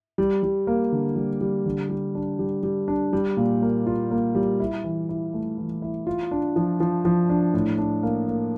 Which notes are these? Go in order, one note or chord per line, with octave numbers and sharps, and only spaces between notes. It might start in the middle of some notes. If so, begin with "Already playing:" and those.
G3
G3
A#3
D3
G3
G3
D3
G3
D4
G3
G3
D4
G3
A#2
A#3
F4
A#3
G3
E4
E3
E4
A3
E3
E4
F4
D4
F3
F3
F3
D4
A2
D4
A#3
A#3